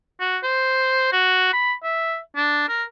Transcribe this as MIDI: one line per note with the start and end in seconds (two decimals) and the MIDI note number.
0.20 0.38 66
0.43 1.10 72
1.12 1.51 66
1.53 1.73 83
1.84 2.18 76
2.36 2.68 62
2.68 2.83 70